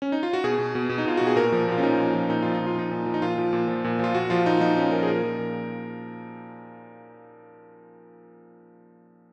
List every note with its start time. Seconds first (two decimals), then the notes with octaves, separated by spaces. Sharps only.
0.02 C#4
0.12 D#4
0.23 F4
0.33 F#4
0.44 B2 G#4
0.58 B2
0.75 B2
0.89 B2
0.98 D#4
1.05 B2 F4
1.17 B2 F#4
1.27 G#4
1.36 A#2 A#4
1.52 F3
1.68 A#2 F4
1.78 C#4
1.83 F3 D#4
1.98 A#2
2.14 F3
2.29 A#2 D#4
2.42 F3 F4
2.55 D#4
2.60 A#2
2.66 F4
2.76 F3 D#4
2.91 A#2
3.06 F3
3.14 D#4
3.22 A#2 F4
3.38 F3
3.53 A#2
3.68 F3
3.84 A#2
3.99 F3 F4
4.14 A#2 F#4
4.30 F3 F4
4.46 A#2 D#4
4.61 F3 D#4
4.77 A#2 C#4
4.92 F3 A#4
5.03 G#4
5.08 A#2 A#4
5.23 F3
5.38 A#2